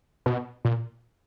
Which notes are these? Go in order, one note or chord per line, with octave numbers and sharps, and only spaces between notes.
B2
A#2